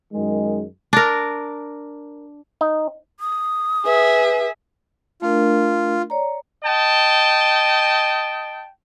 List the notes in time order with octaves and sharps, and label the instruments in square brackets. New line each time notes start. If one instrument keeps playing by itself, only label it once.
[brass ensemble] F#2 D#3 G#3
[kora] D4 A#4
[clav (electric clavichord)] D#4
[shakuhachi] D#6
[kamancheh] G#4 E5 [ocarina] B4
[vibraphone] A3 D4 A#4 [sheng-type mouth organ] F4
[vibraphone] C#5 D5 A#5
[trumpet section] D#5 G5 A5